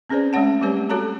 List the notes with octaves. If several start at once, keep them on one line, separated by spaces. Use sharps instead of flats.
C4 C#4 G#4 B4 C5 D5
G#3 A3 C#4 C#5 F#5 A5
G3 A3 C4 G4 B4 C#5
F#4 A4 C#5 A5 A#5